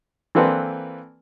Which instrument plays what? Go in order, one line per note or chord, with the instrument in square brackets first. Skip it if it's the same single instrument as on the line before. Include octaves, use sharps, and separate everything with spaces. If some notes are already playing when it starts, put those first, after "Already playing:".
[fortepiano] E3 A#3 C4 D4 A4 B4